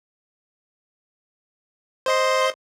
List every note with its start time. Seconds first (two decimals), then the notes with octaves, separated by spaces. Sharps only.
2.06 C5 D#5 C6